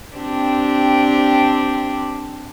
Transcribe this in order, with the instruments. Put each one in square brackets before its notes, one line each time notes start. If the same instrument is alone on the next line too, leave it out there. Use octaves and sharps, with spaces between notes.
[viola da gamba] C4 D4 G4